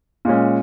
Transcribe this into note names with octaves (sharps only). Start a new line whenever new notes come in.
A#2 G#3 C#4